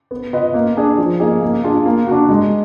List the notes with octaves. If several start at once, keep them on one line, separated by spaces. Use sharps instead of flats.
B3
F4 B4 D#5
A#3
D4 G#4 D5
F3
A#3 D#4 G#4
A#3
D4 F4 G#4
A#3
D4 F#4
G#3